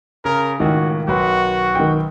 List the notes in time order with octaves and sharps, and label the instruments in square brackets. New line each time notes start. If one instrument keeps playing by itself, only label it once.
[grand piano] C#3 [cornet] A#4
[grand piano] C#2 A2 [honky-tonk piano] D#3 [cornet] F#4
[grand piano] B1 B4 C6 [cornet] F#4
[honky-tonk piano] D#3 G5